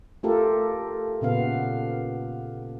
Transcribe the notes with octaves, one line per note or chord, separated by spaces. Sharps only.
A3 F4 G4 A4 A#4
A#2 C#3 B3 F5